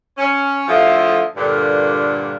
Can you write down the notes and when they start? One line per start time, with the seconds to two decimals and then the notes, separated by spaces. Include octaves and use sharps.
0.18 C#4
0.68 D3 F3 A3 E4 F4 G#4
1.36 G2 A#2 D3